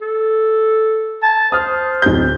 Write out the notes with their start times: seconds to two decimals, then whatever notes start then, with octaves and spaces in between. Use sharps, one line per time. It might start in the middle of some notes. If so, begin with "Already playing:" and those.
0.02 A4
1.23 A5
1.52 C5 D#6 F6
2.02 D1 G6